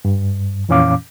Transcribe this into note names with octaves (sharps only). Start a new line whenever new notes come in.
G2
F2 A#2 E3 C#4 F5 D6